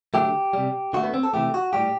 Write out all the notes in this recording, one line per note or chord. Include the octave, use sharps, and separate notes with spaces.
D3 F#3 A3 G4
C3 G3
D3 A3 F#4
B3
C4
A4
C3 E3 A3 G4
F#4
A2 G3 G4